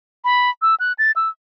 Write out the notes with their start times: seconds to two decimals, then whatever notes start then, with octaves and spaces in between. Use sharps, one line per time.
0.24 B5
0.62 E6
0.80 F#6
0.99 A6
1.16 E6